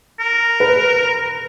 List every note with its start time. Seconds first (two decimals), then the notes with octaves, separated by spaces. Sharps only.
0.20 A#4
0.60 B4